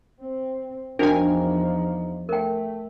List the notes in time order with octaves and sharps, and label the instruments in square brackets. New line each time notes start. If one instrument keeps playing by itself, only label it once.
[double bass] C4
[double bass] E2 F3 [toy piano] D4 F#4 G5 [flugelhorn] D#4 [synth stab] A#4 G#5
[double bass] A3 [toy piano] A#4 G5